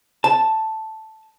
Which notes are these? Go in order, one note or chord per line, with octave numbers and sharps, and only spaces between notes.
A5